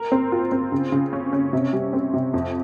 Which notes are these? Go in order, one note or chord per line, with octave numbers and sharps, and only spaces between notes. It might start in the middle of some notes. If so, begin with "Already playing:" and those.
Already playing: A#4
C4
F4
C4
C#3
C#3
C#4
C#4
C3
G3
C4
C3
F2